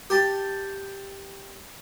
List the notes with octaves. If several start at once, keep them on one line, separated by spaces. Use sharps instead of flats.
G4 A5